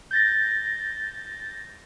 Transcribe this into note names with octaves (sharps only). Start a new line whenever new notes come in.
G6 A6 A#6